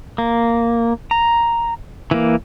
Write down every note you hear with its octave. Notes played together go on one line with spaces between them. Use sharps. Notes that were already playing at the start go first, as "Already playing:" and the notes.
A#3
A#5
E3 A#3